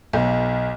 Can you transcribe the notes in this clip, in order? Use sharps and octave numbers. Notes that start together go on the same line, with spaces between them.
B1